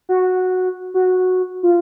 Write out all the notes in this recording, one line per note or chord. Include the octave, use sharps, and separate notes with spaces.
F#4
F#4
F4